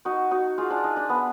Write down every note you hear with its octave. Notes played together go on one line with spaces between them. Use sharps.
D#4 F#4
D#4 F#4
F4 G#4
D4 F4
D#4
D4
B3